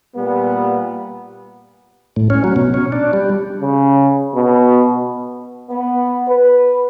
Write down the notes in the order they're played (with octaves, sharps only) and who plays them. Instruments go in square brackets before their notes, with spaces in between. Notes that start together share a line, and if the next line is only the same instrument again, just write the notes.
[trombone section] A#2 G3 B3
[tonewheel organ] A2
C#4
F#3
B2
C#4
D4
G3
[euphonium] C#3
B2
[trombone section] B3
B4